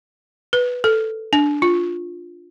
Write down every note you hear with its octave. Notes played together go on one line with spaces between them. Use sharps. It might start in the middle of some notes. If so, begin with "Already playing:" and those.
B4
A4
D4
F4